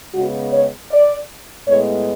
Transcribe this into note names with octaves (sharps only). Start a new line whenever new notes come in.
C#3 G#3 B3 F#4
C#5
D5
A2 G#3 B3 C#5